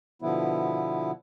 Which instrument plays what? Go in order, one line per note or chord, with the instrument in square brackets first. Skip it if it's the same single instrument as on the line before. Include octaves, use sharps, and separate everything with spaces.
[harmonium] B2 D3 F3 B3 E4